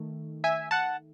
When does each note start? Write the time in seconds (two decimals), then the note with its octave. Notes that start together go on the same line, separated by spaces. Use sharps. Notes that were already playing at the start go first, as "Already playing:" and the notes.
Already playing: D#3 A3
0.44 E5 G#5
0.71 F#5 A5